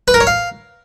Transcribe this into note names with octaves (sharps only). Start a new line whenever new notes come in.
B4
A#4
C#5
F5